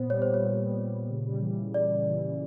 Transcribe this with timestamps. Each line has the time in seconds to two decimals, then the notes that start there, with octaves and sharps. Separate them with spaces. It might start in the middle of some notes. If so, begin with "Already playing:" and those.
Already playing: A#2 B3 C5
0.10 G3 C#5
0.22 C5
0.27 A#2
0.34 C#5
0.44 A#2
0.59 B3
0.76 G3
0.93 A#2
1.10 C#3
1.26 G3
1.42 E3
1.59 C#3
1.74 C#3 D5
1.91 G3
2.08 E3
2.24 C#3